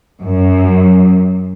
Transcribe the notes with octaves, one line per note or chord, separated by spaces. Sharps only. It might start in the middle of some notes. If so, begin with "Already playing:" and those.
F#2